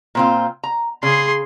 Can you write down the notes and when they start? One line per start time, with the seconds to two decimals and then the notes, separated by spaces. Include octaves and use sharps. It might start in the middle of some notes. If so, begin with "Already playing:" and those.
0.15 A#2 C4 F4
0.64 A#5
1.03 C#3 G#4 C6